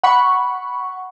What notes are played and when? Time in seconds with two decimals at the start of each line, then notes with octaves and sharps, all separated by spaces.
0.03 F#5 B5 C#6